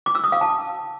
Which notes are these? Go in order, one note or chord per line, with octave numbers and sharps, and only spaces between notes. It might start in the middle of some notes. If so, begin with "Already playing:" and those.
D6
E6
D#6
F5
A5